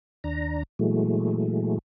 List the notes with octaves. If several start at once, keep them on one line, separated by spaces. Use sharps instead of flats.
D#2 D4 A#5
A#2 E3 F#3 G#3 A3